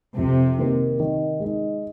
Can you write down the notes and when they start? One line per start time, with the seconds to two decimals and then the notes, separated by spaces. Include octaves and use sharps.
0.17 F2 C3
0.58 D#3 A#3 D#4 A#4
1.00 D#3
1.40 G#3 D#4